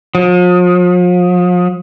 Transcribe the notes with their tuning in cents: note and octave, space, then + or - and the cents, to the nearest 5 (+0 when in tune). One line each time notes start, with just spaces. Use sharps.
F3 +40